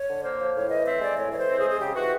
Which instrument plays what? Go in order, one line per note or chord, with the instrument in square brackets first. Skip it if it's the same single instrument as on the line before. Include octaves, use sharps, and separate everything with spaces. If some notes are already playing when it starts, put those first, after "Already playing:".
Already playing: [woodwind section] C#5
D3
A#3 C5
F3
A2 C#5
E3 D#5
C4 E5
G#3 D5
A2 C#5
E3 C#5
C5
C4
G#4
G#3
G#4
C#3 G4
E3 F#4